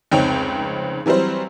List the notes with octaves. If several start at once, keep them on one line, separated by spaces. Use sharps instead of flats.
F1 C#2 C4 D#4 C#5 G5
E3 F#3 G3 C4 C5